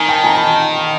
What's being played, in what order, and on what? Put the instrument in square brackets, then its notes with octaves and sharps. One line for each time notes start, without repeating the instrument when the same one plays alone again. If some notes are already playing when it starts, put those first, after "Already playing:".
Already playing: [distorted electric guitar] D#3 [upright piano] G#5 A#5
[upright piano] G5 A5
G#5 A#5
A5 B5